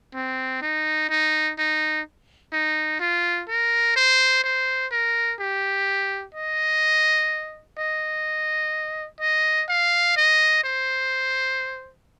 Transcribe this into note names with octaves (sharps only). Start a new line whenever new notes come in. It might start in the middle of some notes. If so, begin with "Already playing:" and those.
C4
D#4
D#4
D#4
D#4
F4
A#4
C5
C5
A#4
G4
D#5
D#5
D#5
F5
D#5
C5